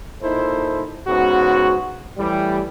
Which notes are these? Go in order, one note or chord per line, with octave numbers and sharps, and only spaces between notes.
A#2 D#4 E4 A4 C5
G#2 C#3 B3 F#4
A2 E3 G3